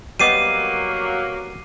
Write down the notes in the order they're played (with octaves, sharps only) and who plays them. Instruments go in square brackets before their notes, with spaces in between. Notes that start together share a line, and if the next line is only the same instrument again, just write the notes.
[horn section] F#3 A#3 [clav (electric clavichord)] G3 B3 D#5 [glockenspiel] D6 C7 D#7